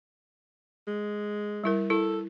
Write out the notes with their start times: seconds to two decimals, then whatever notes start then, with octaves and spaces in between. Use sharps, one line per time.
0.87 G#3
1.64 G3 E4 A#4
1.90 E4 A4